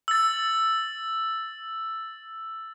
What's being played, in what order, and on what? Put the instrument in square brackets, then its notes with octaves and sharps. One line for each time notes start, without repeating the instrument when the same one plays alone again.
[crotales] E6 A6